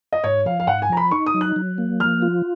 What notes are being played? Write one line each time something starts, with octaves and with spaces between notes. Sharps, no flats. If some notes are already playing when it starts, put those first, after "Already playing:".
D#5
G#2 C#5
F3 F5
F5
G#2 F#5
G#5
F3 A#5
B5
D#4 C#6
D#6
F#3
F#6
F#3
A#3
F3 F6
F4